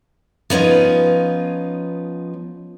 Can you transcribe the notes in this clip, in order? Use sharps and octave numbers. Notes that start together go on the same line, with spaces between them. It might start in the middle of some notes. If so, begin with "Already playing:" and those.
F3 B3 C#4 D#4 F4